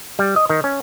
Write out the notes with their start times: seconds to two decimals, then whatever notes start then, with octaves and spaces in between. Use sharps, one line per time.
0.19 G3
0.36 D#5
0.49 D#3
0.64 C#4